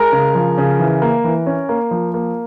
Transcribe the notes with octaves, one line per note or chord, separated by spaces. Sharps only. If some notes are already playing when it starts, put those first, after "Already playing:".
Already playing: G#3 A#4
C#3
F3
C#3
E3
A#3
E3
C#4
A#3
F3
A#3